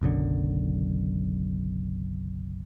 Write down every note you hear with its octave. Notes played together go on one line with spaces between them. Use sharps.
F#1 B1 F#2 D3